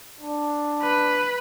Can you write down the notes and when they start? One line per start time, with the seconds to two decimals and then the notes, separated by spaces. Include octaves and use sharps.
0.21 D4
0.82 B4